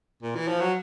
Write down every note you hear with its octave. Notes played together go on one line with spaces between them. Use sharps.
A#2
E3
F3
F#3